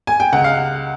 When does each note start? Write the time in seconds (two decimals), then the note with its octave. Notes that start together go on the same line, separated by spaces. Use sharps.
0.07 G#5
0.20 G5
0.33 C#2 F#5
0.44 F5